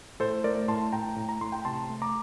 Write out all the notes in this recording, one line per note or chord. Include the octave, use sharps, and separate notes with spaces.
A2 A4 C5
A3 A#4 D5
A2 A5 C6
A2 G5 A#5
A2
A#5
A2 C6
G5 A#5
C3 A5 C6
A3
A#5 D6